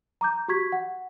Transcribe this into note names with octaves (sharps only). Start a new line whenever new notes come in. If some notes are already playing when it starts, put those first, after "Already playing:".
A#5 D6 G6
F#4 G4 C#6 G#6 B6
F#5